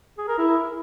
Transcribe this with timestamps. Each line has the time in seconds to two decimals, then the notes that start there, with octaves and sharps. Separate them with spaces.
0.18 G#4
0.28 A#4
0.38 E4